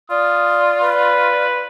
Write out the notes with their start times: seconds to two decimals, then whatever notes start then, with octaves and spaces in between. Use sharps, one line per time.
0.10 F4 D5 D#6
0.83 B4